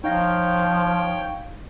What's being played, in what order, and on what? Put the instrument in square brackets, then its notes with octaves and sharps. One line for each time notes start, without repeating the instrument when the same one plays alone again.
[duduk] F3 [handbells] D#4 F5 A#6 [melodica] C#5 G5